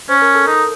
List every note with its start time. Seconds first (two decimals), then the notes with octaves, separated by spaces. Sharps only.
0.09 C#4 C5
0.22 A#4
0.35 A4
0.47 D#4 A#4